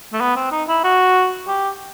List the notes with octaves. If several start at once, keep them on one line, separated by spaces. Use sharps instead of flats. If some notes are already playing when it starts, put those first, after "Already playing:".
A3
B3
C4
D#4
E4
F#4
G4